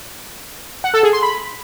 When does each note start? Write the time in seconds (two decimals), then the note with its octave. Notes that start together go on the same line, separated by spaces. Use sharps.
0.84 F#5
0.94 A4
1.03 G#4
1.13 C6
1.23 B5